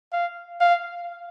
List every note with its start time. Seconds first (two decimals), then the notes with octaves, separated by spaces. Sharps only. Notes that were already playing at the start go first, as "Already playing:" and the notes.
0.12 F5
0.61 F5